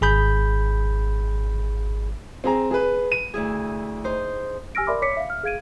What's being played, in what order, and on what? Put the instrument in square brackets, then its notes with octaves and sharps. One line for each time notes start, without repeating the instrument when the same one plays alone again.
[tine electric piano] G#1 G#4 B5 G6
[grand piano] C4 G#4 A#5
G#4 B4
D#7
[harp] D2 E4 G#4
D#4 C5
[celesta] G4 G#5 E6 F6 A#6 D7
A#4 D5 E5 B5 C6 D6
C#5 D6 B6 C#7
E5 F5
F6
G#4 F5 G#6 D7 D#7